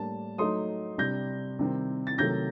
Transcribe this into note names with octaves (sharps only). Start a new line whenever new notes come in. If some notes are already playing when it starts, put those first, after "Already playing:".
Already playing: A2 G3 A#3 D4 A5
F#3 A3 D#4 C6 D#6
C3 G3 D4 G6 A#6
C3 D#3 G3 C4
A6
C3 D#3 F#3 A3 G6 A#6